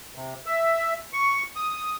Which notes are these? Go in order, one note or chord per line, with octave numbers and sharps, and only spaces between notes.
C3
E5
C#6
D#6